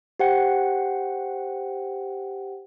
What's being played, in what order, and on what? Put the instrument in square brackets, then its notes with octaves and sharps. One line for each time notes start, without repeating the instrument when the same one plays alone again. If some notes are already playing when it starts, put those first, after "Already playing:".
[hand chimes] G4 C5 F#5 G5 C#7